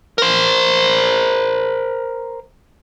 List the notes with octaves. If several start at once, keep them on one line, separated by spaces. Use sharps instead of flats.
A#4 C5